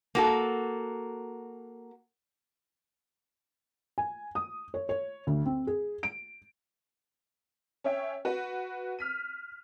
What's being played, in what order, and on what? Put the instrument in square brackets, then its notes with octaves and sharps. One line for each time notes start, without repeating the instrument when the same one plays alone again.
[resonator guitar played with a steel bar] A#3 F#4 A4
[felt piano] G#5
D#6
C#5
C#5
D2
C4
G#4
D7
[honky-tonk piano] C#4 C#5 E5 G5
F#4 B4
F6 B6 D#7